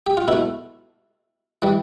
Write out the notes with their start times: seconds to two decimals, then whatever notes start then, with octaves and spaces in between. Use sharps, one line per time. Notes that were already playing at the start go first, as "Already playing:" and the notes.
0.07 G4
0.17 F4
0.28 B2 A3 E4
1.62 E3 G3